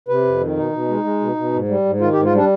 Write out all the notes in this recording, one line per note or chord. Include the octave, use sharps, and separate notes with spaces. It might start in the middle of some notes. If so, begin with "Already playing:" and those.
C3 B4
F2
D#3
B2 D#4
B2
G#3
G#3
B2
B2
G#2
G3
G#2
D#3 F4
G4
G#2
F4
G3 D4